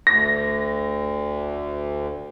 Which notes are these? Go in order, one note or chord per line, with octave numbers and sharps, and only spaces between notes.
D2 A#6